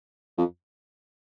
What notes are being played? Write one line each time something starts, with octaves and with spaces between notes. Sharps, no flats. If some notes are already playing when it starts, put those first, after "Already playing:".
F2